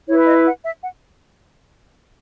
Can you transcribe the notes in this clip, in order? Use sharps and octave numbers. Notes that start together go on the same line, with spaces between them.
E4 B4 C#5
D#5
F#5
E5
F#5